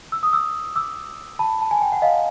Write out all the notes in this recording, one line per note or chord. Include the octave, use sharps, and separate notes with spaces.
E6
D#6
D6 E6
D6 E6
A5 B5
A5
G#5
G5
F#5
D#5 F5